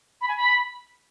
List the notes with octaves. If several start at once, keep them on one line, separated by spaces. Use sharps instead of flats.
B5
G#5
B5